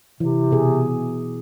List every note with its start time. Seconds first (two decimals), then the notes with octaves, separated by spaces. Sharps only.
0.20 C3 E3
0.51 B2 G#4